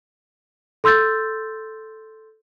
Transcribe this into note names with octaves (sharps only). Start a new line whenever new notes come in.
A4 C6 E6 G6 A6